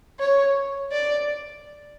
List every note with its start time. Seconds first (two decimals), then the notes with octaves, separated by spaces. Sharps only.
0.19 C#5
0.92 D5